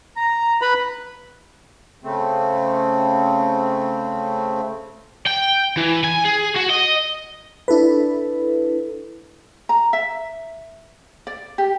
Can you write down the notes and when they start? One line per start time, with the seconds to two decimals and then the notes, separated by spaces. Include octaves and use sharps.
0.17 A#5
0.62 B4 B5
2.04 C#3 A3 C4
5.26 G5
5.77 E3
6.04 G#5
6.25 G#4
6.56 F#4
6.70 D#5
7.68 D4 E4 A4 B4
9.69 A#5
9.93 E5
11.27 D5
11.58 G4